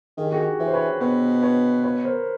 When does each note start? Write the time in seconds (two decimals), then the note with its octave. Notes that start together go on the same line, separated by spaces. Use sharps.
0.17 D#3 G#4
0.25 G4
0.32 F#4 G#4
0.59 E3 C#5
0.67 C5
0.73 B4 C#5
1.00 B2 B4 C#5
1.42 B4 C#5
1.84 B4 C#5
2.04 A#4 C5